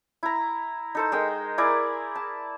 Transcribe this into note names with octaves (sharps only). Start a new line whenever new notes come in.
E4 A#5
D#4 A4 C5
G#3 A#4 D#5 G5
E4 G#4 A#4 D5
A5